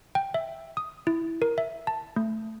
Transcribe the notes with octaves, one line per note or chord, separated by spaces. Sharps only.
G5
E5
D#6
E4
A#4
E5
A5
A3